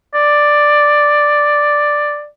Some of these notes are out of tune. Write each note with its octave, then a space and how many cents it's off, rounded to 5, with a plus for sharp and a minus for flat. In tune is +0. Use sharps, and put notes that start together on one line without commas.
D5 +5